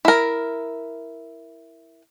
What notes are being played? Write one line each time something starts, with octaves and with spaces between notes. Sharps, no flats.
E4 A#4